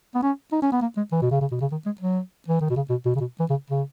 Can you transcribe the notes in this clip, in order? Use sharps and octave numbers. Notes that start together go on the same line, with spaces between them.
B3
C#4
D#4
C#4
B3
A#3
G#3
E3
B2
C#3
C#3
B2
C#3
D#3
G#3
F#3
E3
D#3
B2
C#3
B2
B2
C#3
B2
E3
C#3
C#3